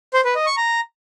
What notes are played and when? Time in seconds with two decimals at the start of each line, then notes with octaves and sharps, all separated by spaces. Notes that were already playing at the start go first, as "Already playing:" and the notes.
0.14 C5
0.25 B4
0.35 D#5
0.46 C#6
0.57 A#5